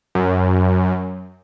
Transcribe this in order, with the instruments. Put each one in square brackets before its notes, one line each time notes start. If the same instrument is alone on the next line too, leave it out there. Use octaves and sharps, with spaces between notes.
[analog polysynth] F#2